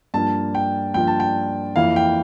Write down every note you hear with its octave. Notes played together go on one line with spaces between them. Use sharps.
G2 F3 A#3 D4 A5
G5
G2 F3 A#3 D4 G5
A5
G5
F2 E3 A#3 E4 F5
G5